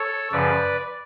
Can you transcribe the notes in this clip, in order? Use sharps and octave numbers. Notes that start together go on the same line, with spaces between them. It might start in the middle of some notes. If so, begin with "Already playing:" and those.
Already playing: A4 C#5
F#2 C#3 F3 B4 D5